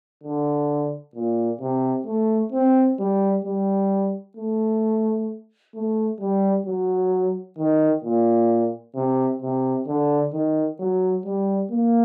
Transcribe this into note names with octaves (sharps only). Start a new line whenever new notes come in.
D3
A#2
C3
A3
C4
G3
G3
A3
A3
G3
F#3
D#3
A#2
C3
C3
D3
D#3
F#3
G3
A#3